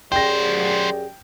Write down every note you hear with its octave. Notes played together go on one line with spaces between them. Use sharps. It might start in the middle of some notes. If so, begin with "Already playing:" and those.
F#2 F#3 G4 G#4 C5 D5 G5 A#6